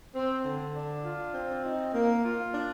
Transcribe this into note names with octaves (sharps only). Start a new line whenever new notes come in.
C4
D3
D4
F4
C4
D#4
A#3
F4
D4